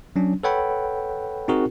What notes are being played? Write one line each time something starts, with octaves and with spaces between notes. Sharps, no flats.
F#3 C#4 D4
A4 B4 C#5 F#5 G5 B5
C4 D#4 F#4 G#4 A#4